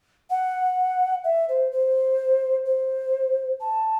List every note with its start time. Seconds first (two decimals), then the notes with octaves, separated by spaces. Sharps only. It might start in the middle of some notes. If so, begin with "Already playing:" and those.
0.30 F#5
1.24 E5
1.49 C5
1.72 C5
2.65 C5
3.61 A5